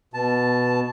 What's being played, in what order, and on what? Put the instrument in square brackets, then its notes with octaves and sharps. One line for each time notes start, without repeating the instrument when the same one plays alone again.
[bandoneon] B2 A5